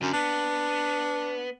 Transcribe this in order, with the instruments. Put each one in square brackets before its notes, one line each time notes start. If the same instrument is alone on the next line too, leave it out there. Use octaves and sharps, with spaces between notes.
[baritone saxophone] F#2 [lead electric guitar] D3
[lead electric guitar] B3 [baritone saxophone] D4